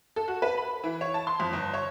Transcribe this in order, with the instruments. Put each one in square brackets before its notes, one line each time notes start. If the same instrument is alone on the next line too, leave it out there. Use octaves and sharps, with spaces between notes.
[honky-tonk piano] A4
F#4
B4
B5
E3
C#5
A5
C6
F2
G1
C#5